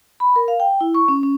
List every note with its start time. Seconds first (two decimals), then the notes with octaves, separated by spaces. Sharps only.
0.20 B5
0.36 A#4
0.48 F5
0.60 G5
0.81 E4
0.94 C#6
1.08 C#4
1.23 C#4